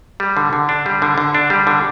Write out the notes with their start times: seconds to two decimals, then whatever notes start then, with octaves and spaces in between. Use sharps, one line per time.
0.20 G3
0.37 D3
0.53 D3
0.69 D4
0.86 G3
1.02 D3
1.18 D3
1.34 D4
1.50 G3
1.67 D3